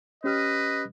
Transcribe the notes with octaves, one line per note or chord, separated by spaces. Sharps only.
C#4 G4 B4 D#5 F6